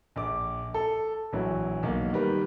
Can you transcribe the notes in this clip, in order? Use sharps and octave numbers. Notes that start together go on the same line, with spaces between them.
A#1 D6
A4
A#1 E3 F#3
B1 A#3
D#3 G3 A#4 B4